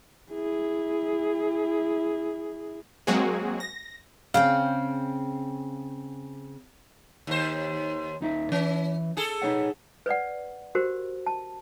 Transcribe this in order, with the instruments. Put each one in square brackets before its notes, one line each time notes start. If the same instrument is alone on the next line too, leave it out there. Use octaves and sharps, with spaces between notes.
[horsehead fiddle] E4 G#4
[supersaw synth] F#3 G#3 A#3 C4 F#4 G#4
A#6
[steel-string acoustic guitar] C#3 C4 [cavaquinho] F5 G5
[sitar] D#2 C5
[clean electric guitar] D#2 D#4 E5
[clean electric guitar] E3 E5 [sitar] C#4
[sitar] G#4 A4
[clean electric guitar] D#4 C#5 F#5
[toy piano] B4 C#5 D5 F#5
F#4 G4 A#4 C5
A5